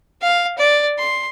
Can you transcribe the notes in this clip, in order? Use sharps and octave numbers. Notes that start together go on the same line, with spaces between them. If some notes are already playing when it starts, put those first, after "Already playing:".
F5
D5
C6